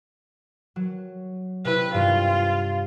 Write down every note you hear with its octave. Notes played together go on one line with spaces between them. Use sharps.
F#3
C3 E4 B4
G2 C3 F4